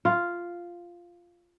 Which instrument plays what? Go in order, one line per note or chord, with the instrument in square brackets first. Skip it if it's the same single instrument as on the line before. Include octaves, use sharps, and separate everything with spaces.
[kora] F4